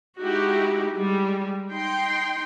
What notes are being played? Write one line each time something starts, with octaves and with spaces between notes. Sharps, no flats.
G#3 D#4 E4 F#4 G4
G3 G#3
D#4 G5 C6